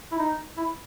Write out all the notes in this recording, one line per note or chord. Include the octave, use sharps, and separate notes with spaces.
E4
D#4
E4